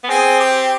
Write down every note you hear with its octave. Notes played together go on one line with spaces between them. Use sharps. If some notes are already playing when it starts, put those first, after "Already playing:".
B3
C4 G#4
G4